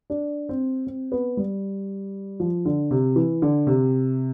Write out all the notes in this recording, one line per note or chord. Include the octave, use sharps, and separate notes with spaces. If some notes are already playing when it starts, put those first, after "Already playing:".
D4
C4
C4
B3
G3
F3
D3
C3
E3
D3
C3